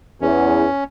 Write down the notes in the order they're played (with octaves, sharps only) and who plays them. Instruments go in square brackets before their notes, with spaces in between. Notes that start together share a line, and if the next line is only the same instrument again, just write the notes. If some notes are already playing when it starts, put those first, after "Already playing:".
[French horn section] E2 [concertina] C#4